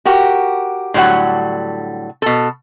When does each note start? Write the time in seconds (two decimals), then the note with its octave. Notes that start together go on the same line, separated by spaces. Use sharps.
0.05 F#4 G4 A#4
0.94 A2 D3 F#3 G3 F#5
2.22 B2 A4